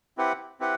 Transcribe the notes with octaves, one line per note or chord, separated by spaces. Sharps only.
C4 E4 G4 B4 F#5
C4 E4 G4 B4 F#5